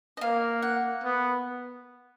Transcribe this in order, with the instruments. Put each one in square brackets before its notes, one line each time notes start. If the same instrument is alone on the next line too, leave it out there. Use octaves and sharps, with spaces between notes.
[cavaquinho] D#5
[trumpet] A#3 [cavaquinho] F5
[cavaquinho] F#5
[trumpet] B3